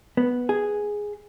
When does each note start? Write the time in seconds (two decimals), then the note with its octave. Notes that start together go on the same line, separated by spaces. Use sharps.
0.17 B3
0.49 G#4